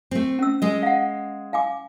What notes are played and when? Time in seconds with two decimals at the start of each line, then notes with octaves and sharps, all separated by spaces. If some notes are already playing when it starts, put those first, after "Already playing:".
0.11 A3 C4
0.39 C#4 E6
0.62 G#3 D#5
0.83 F5 F#5
1.53 F5 G#5 D6